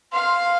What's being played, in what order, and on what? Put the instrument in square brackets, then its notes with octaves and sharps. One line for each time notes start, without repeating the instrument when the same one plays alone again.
[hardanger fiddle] F5 [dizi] C6